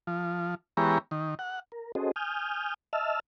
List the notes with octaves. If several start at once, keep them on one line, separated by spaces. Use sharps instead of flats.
F3
E3 G#3 B3 G4 C#5 A#5
D#3
F#5
A#4
C#4 F#4 G#4 A4 C5 D#5
G#5 D#6 F6 G6
D#5 E5 A5 E6 F6